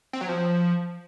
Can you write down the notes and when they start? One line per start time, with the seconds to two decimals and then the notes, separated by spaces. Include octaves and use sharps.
0.13 C4
0.21 F#3
0.29 F3